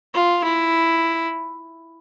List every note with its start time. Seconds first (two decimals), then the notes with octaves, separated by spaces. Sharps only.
0.14 F4
0.44 E4